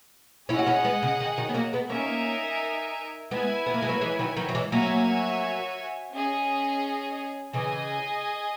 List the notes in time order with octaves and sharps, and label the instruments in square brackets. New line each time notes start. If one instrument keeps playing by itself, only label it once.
[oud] C#4 E4 [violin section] G#4 D#5 F#5
[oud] F#4
C#4 E4
G#3 B3
C#3
D#3
D#3 F#3
B3
F#3 A#3
G#3 B3
[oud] A#3 C#4 [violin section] D#4 A#4 E5 G#5
[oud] G#3 B3 [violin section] E4 B4 E5 G#5
[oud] B3
A#3
G#3
F#3 A#3
E3 G#3
D#3 F#3
D#3 F#3
F#3
E3 G#3
[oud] F#3 A#3 [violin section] F#4 C#5 E5 G#5
[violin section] C#4 G#4 D#5
[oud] C#3 E3 [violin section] G#4 D#5 G#5